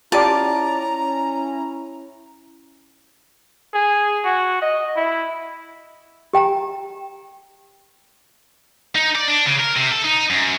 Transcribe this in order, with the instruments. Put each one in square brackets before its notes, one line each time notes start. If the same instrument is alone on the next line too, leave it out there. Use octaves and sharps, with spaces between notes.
[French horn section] C#4 E4 [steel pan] F4 G4 D5 [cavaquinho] A5 [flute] A#5
[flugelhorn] G#4
F#4
D#5
E4
[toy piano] G4 G5 G#5 A#5
[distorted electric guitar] D#4
D5
D4
C#3
A#4
C3
A4
D#4
F#2